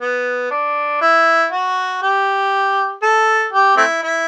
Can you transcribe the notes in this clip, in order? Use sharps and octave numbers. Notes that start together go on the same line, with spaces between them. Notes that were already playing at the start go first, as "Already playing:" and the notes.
B3
D4
E4
F#4
G4
A4
G4
A3 C4 E4
E4